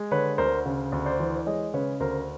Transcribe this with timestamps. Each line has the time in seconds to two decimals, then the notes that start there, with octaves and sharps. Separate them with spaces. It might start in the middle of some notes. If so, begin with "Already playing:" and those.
Already playing: G#3
0.11 D3 B4 C#5
0.38 D2 A#4 C5
0.66 C#3
0.92 D2
1.06 C5 D5
1.20 E3
1.37 D5
1.46 G#3 C#5 D#5
1.74 C#3 B4 C#5
2.00 D2 A#4 C5